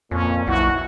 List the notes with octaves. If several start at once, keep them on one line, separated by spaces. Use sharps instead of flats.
F2 A#2 C#4
B1 E4 F#4